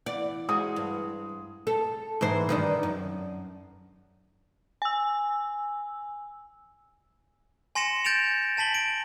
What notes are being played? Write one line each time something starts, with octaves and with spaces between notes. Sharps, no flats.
E3 B3 D5
G#3 F#4 C5 D#6
G2
A4
G#2 E3 C5
G2 D#3 D4
F#2
G#5 E6
G#5 C6 A#6 C#7 E7
G6 A6 D7 E7 F7
G#5 A5 B6 F#7 G7
D7